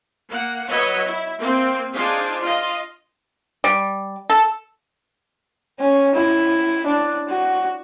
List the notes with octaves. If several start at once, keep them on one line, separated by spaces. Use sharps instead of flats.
A#3 F#5
F#3 B4 C#5 D#5 E5 F#5
E4
A#3 C4
D4 D#4 F4 G#4 C5
F4 D#5
G3
A4
C#4
E4
D4
F#4